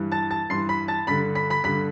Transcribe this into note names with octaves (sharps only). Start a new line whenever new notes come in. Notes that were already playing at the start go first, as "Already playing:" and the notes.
Already playing: G2 E3
A5 A6
A5 A6
G2 E3 C6 C7
B5 B6
A5 A6
G2 D3 B5 B6
B5 B6
B5 B6
G2 D3 B5 B6